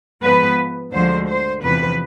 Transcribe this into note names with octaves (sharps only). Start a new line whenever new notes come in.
G#2 F3 G#3 B3 B4
D2 D3 F3 G#3 C5
C5
E2 C3 F3 B4